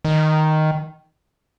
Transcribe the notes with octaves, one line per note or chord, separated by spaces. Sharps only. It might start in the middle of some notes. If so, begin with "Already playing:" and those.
D#3